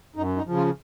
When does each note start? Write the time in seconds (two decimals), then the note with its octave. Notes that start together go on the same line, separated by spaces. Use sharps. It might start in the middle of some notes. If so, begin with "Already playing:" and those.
0.15 F#2 D#4
0.36 D#4
0.46 C#3 F3
0.57 F4